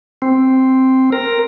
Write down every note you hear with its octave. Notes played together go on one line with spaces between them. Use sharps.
C4
A#4